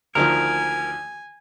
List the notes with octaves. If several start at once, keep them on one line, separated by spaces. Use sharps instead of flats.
D2 D#3 F3 A#4 G#5